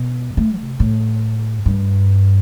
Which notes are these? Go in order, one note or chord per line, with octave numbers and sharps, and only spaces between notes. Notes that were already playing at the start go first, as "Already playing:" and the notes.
Already playing: B2
A3
C3
A2
G2